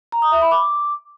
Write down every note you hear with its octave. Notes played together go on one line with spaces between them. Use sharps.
A#5
D#6
E5
B5
D6